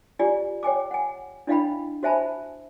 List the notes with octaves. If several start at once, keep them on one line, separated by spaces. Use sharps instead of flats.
F4 G4 D5 G#5
C#5 G5 G#5 D6
F#5 G#5
D4 E4 D#5 F5 G5 B5
F#4 C5 E5 G#5 A5 B5